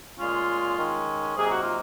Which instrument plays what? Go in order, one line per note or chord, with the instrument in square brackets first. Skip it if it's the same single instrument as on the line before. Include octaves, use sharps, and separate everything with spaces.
[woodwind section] A#2 G#3 C#4 F4
D#3 G#3 C#4
C3 F#3 A#3 D#4 G#4
F#4
F4